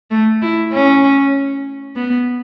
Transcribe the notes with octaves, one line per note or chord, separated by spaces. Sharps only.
A3
E4
C#4
B3